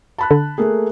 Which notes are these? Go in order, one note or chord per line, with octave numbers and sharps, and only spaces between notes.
A5 B5 F#6
D3
A3 A#3 G#4